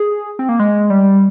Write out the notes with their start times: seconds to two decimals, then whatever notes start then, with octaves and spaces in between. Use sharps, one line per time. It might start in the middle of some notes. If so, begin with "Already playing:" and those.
Already playing: G#4
0.39 C4
0.49 A#3
0.59 G#3
0.90 G3